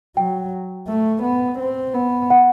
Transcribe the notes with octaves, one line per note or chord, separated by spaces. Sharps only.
F#3 G5
A3
B3
C4
B3
F#5